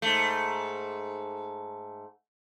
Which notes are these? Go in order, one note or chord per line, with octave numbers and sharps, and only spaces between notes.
G#2 A3